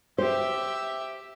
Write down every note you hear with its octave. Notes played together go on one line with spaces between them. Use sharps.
G4 C5 E5